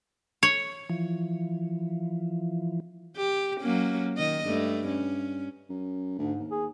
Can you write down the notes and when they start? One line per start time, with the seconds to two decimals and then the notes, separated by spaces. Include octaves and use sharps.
0.43 C#5
0.90 E3 F3
3.17 G4
3.61 F#3 A#3 C#4
4.17 D#3 D#5
4.46 G2 A3
4.87 C#4
5.70 F#2
6.19 D2 G#2
6.39 D#2
6.51 G#4